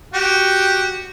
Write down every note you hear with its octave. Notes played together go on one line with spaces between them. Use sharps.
F#4 G4